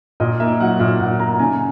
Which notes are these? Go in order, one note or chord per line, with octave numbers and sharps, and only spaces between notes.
A#2 D#5
A#3 E5
F#3 F#5
A#2 E5
A#2 F#5
A#3 A#5
C#3 G#5